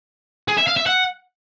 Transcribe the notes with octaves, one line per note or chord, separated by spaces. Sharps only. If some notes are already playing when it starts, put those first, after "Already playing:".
G#4
E5
F5
E5
F#5